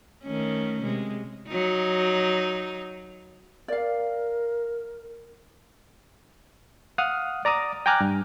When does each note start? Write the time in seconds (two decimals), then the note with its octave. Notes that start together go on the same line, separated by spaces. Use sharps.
0.24 D#3 A3 C#4
0.82 C3 G#3
1.48 F#3 D#4
3.68 A#4 D5 F5
6.98 F5 F#5 D#6 F6
7.45 D5 A#5 D6 D#6
7.86 G5 G#5 A#5 D6 F6 F#6
8.01 G2